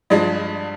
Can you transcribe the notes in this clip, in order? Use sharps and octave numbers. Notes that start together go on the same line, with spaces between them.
G2 F3 G#3 D4 D#5